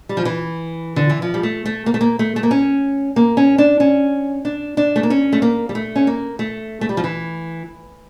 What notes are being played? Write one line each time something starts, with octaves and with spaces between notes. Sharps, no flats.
G3
F3
E3
D3
E3
F3
G3
A3
A3
A#3
A3
A#3
A3
A3
A#3
C#4
A#3
C#4
D4
C#4
D4
D4
A3
A#3
C#4
A3
A#3
G3
A3
C#4
A#3
A3
A3
G3
F3
E3